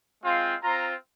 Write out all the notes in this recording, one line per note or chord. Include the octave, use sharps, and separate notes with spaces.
G#3 C4 F4
C4 F4 A#5